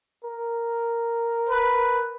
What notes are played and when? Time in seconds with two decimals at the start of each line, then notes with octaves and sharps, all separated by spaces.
0.24 A#4
1.49 B4